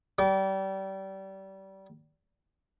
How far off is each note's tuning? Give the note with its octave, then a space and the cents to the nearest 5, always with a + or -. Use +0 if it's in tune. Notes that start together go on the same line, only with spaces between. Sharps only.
G3 -25 D6 -35